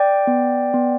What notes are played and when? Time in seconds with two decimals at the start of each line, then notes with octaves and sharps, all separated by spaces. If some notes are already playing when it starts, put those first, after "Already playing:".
Already playing: D5 G5
0.27 B3
0.74 B3